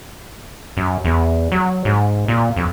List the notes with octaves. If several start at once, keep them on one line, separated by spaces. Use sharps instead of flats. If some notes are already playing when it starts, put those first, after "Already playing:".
F#2
E2
F#3
G#2
A#2
F2